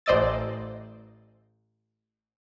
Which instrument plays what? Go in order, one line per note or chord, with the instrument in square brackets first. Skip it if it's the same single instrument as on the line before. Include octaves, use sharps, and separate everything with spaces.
[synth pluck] A1 C5 D5 D#5 E6 A6